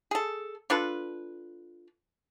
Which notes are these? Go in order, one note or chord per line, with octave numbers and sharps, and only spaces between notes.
G#4 A4
D4 F4 A4 B4